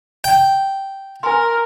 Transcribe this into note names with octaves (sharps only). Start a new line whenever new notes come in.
G5
A#4 G#5 C6